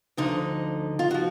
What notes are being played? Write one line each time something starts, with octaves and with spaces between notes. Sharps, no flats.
D2 D3 F3 D#4
F4
F3 F#4